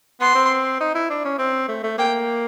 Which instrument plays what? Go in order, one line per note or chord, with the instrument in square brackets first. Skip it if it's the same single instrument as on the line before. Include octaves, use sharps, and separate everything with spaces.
[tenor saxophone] B3 [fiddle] C6
[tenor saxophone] C4
D#4
E4
D4
C#4
C4
A3
A3
[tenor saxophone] A#3 [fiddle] G5